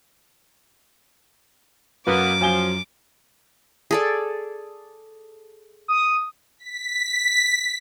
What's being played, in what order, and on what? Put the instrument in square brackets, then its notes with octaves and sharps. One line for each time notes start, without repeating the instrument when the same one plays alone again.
[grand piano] F#2 [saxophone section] B2 A#3 B3 [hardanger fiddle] D6
[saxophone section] F3 [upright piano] F#3 G#5 G7
[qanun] G#4 A4 D5
[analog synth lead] D#6
[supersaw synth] B6